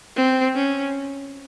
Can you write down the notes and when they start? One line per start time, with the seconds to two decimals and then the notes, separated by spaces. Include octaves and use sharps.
0.16 C4
0.55 C#4